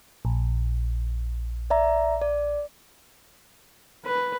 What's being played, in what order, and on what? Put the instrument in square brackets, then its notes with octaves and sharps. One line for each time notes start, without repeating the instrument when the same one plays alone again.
[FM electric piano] A#1
[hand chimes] D5 E5 A#5
D5
[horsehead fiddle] B4